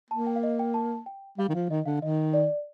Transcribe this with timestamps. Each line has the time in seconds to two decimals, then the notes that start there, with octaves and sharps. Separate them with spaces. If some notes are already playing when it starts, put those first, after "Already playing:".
0.11 A#3 A5
0.27 G5
0.36 F5
0.43 D#5
0.59 G5
0.74 A5
1.06 G5
1.38 G3 F5
1.49 D#3
1.55 F3 F5
1.70 D#3 D#5
1.86 D3 F5
2.02 D#3 D#5
2.33 D5